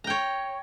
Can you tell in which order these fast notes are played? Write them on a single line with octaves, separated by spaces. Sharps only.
A#5 G5 C#5